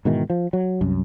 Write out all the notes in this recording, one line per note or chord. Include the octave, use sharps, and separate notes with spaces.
G#2 B2 D#3 E3
F3
F#3
C2 F#2